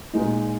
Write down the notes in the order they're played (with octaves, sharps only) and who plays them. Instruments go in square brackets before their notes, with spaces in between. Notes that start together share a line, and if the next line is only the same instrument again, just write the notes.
[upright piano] A#2 G#3 D#4